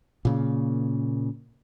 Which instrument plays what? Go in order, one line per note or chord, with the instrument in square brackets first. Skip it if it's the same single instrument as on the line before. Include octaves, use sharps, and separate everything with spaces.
[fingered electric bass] A#2 C#3 A#3